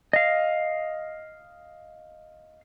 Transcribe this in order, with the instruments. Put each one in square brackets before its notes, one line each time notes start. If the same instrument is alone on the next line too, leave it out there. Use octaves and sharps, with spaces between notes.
[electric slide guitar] D#5 F5